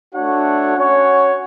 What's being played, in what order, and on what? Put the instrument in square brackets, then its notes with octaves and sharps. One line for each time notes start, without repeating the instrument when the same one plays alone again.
[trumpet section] A3 D4 F#4 C#5 F#5
C#4 F#4 C#5 F#5